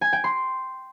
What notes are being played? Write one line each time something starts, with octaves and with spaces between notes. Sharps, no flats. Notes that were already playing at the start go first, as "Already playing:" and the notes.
G#5
G5
C6